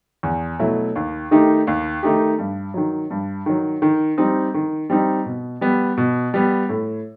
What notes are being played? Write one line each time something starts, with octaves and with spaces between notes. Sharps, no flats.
E2
B2 F#3 A3 E4
D#2
D#3 A3 D#4 G4
D#2
D#3 A3 D#4 G4
G2
D#3 F#3
G2
D#3 F#3
D#3
G3 C4 D#4
D#3
G3 C4 D#4
B2
G3 B3
B2
G3 B3
A2